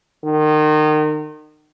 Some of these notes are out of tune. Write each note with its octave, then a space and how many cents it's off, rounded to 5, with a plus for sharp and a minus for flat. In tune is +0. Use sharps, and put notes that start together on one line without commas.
D#3 -30